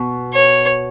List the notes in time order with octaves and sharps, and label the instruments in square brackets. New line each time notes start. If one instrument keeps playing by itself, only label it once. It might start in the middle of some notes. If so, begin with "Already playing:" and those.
Already playing: [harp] B2
[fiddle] C#5